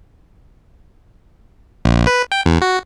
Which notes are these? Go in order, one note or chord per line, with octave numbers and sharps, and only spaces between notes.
A#1
B4
G5
E2
F#4